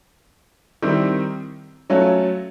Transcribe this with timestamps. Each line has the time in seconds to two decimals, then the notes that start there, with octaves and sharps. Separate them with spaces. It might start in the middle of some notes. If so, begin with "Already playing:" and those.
0.82 D#3 G3 C4 E4
1.90 F#3 A3 C#4 F4